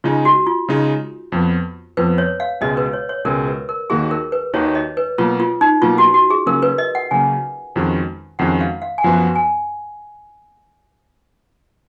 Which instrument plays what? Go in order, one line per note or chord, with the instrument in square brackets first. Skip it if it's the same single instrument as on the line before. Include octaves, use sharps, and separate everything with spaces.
[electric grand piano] C#3 G#3 D#4 G#4 [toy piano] F4
[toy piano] F#4
F4
[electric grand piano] C#3 G#3 D#4 G#4
F2 F3 B3
[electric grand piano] F2 F3 B3 [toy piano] B4
[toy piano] C#5
F5
[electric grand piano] C#2 B2 G#3 C#4 G#4 [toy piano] D#5
[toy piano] B4
C#5
C#5
[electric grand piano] C#2 B2 G#3 C#4 G#4 [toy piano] A#4
[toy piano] B4
A#4
[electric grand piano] D#2 D#3 A#3 D#4 F#4 [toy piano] G#4
[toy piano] A#4
B4
[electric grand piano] D#2 D#3 A#3 D#4 F#4 [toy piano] C#5
[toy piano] C#5
D#5
B4
[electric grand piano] B2 F#3 A#3 [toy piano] F4
[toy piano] F4
D#4
[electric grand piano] B2 F#3 A#3 [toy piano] F4
[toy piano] F#4
F#4
G#4
[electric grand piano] C#3 F#3 A#3 C#4 [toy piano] A#4
[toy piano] B4
D#5
F#5
[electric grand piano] C#3 F#3 A#3 C#4 [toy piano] G#5
[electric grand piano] F2 D#3 G#3 C#4 F#4
[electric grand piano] F2 D#3 G#3 C#4 F#4 [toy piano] F#5
[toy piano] F5
F5
G#5
[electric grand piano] F#2 F3 B3 F#4 [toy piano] F#5
[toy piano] G#5